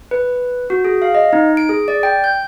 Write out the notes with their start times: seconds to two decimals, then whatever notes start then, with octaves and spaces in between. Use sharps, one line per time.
0.11 B4
0.70 F#4
0.85 G#4
1.02 F5
1.15 D#5
1.33 D#4
1.57 D7
1.69 G#4
1.88 D5
2.03 G5
2.24 G6